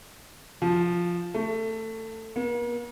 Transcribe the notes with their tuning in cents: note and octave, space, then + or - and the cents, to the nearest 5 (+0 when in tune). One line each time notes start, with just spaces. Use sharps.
F3 +0
A3 +20
A#3 +45